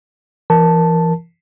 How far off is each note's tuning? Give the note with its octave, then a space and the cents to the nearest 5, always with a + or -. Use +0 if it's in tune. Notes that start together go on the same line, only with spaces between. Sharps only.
E3 +30 A#4 +0 A5 +0